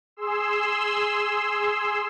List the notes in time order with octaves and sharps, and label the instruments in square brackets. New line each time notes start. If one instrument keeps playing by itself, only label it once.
[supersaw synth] G#4 C6 E6